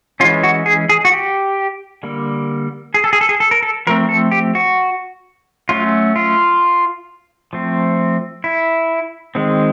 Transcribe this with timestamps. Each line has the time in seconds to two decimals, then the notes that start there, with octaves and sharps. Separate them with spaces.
0.20 E3 G#3 C#4 F4
0.43 F#4
0.66 G#4
0.89 G#4
1.05 F#4
1.12 G4
2.03 D3 G3 A#3
2.94 G#4
3.04 A4
3.13 G#4
3.21 A4
3.29 G#4
3.40 A4
3.51 A#4
3.62 A4
3.87 F3 A3 C4 A#4
4.09 A4
4.32 G4
4.55 F#4
5.69 F#3 A3 C#4 F4
6.16 F4
7.53 F3 A3 C4
8.44 E4
9.35 D#3 G#3 C4